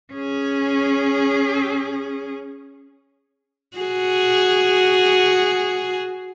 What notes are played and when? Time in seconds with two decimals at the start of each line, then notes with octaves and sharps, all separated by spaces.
0.13 C#4 G#4
3.78 F#4 G#4